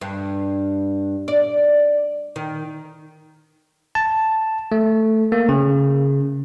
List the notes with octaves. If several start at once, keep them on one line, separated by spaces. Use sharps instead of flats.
G2
D5
D#3
A5
A3
A#3
C#3